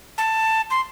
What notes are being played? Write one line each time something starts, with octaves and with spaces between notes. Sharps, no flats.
A5
C6